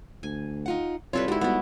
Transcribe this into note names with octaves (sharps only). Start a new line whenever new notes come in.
D2 G#5
D#4 F4 F#5
C2 G3 F4 A4 B4 C#5
G#2 E4 F#4 G4
G3 B3 F#4